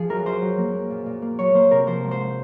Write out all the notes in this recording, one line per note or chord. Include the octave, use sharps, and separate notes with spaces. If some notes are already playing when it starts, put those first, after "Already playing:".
Already playing: F3 G#4
F#2 A#4
F#2 C5
F#3
A#3
A#3
A#2
A#2
A#3
F#3 C#5
A#3 C5
C3 A#4
F3 C5
G#2
C5